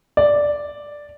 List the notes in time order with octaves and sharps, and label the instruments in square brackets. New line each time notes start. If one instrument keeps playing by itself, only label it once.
[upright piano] D5